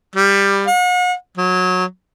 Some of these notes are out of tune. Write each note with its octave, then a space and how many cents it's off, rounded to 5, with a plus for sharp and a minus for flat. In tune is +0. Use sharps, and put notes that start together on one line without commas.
G3 +15
F#5 -40
F#3 -20